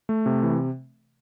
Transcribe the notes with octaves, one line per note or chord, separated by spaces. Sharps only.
A3
C3
E3